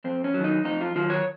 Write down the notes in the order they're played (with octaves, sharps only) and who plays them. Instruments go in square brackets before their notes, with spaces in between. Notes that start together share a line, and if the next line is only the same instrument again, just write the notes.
[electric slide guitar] F2 C4
C#4
D#3 F#3
D#4
F2 D#4
F4
D#3 F#3 F4
C#5